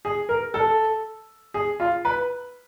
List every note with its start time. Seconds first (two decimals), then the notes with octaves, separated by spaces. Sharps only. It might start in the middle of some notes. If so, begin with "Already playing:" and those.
0.05 G#4
0.29 A#4
0.54 A4
1.54 G#4
1.80 F4
2.05 B4